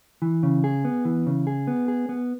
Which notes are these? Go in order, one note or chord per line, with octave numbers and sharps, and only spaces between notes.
E3
C#3
G#4
B3
E3
C#3
G#4
B3
G#4
B3